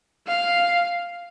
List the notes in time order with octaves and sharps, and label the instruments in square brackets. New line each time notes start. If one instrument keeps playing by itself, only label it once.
[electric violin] F5